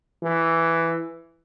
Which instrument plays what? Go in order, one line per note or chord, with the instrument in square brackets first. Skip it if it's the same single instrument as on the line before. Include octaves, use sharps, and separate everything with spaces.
[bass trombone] E3